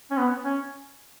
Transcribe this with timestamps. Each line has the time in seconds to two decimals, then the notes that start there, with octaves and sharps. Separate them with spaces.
0.11 C#4
0.17 B3
0.45 C#4